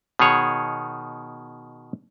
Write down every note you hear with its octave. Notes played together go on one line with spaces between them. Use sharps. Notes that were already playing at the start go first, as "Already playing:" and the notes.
B2 D#3 G#4 C#5 F#5